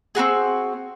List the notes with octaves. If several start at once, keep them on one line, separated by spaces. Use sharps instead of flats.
C4 F4 F#4 G#4